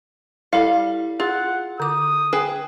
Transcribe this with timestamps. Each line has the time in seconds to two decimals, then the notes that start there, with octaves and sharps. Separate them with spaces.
0.53 G3 E4 A4 F5
1.20 F4 G#4 F#5
1.80 D3 D6 D#6
2.33 G#4 B4 G5 G#5